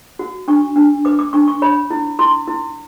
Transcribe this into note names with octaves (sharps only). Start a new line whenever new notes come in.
F#4
D4 C#6
D4
B4 D6
D6
D4 C#6
C#6
C#5 B5
E4
E4 C6
E4